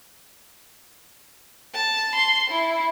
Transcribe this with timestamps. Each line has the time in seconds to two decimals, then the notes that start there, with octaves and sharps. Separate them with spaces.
1.74 A5
2.15 C6
2.49 E4